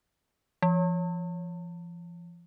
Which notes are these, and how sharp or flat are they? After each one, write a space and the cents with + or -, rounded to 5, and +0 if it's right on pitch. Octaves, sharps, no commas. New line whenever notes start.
F3 -30